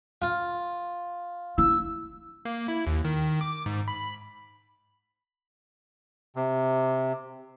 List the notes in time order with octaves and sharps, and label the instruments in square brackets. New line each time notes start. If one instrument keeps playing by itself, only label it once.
[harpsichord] F4
[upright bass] E4 [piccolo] E6
[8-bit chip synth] A#3
E4
D#2
D#3
D6
G#2
B5
[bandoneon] C3